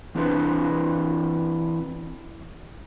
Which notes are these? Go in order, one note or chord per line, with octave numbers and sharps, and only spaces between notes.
E3 C4 D4 E4 B4 C5